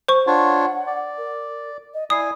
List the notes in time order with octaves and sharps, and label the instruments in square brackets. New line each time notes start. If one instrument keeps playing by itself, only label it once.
[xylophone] C5 C#6
[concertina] D4 F4 C#5 [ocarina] F#5
[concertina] D5
[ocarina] A#4
D#5
[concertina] E4 G#5 [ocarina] D5 [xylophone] D#6 C7